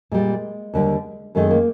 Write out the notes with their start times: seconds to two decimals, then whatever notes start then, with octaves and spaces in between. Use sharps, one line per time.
0.12 A#2 G3 G#3
0.74 D#2 D3 G3
1.35 F#2 D#3 G#3 A3
1.51 A#3